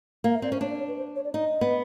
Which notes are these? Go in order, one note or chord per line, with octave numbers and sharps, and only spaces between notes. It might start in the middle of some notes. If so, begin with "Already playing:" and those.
A#3 F5
E5
C4 D5
C#4 C5
D4 C#5
D5
C#5
B4
C5
C#5
D5
D#4 D#5
B3